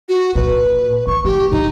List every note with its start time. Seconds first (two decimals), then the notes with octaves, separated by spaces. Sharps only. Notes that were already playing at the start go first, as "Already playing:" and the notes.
0.09 F#4
0.35 A#2 B4
1.07 D#3 C#6
1.25 C#2 A3 G4
1.51 G2 D4 D#4